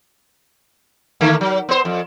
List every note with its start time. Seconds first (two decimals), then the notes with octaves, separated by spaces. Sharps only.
1.21 D3 A3 A#3
1.41 F#3
1.69 B3 C5
1.85 F2